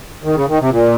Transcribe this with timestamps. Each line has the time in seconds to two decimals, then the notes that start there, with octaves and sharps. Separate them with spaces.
0.24 D#3
0.35 C#3
0.48 D#3
0.59 C3
0.71 A#2